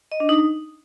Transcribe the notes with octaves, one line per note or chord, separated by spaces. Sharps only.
D#5
D4
D#4